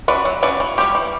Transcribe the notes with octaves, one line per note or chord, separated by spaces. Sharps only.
C#4 F#4 B4 D5
F#3
C#4 F#4 B4 D5
E3
G3 C#4 G4
E3